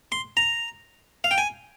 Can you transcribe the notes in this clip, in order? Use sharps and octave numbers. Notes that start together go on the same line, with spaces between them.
C6
A#5
F5
G5
G#5